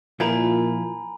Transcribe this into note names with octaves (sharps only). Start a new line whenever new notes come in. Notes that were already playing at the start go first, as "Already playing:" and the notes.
A#2 F3 E4 A#4 G#5 A#5 B5